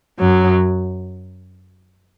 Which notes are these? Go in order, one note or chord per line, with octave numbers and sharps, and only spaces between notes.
F#2 F#3